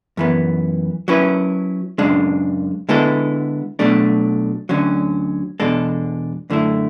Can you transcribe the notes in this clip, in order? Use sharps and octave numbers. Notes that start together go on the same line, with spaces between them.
F#2 E3 B3
F#3 C#4 E4 B4
F#2 C#3 G#3 D4
D3 G#3 B3 E4 A4
B2 F#3 A3 D4
D2 D3 F#3 C#4
E2 B2 G#3 D4 A4
F#2 D3 A3 E4